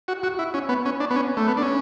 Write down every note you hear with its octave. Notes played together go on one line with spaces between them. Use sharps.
F#4
F#4
E4
C#4
B3
C#4
D4
B3
C#4
A3
B3
D4
C#4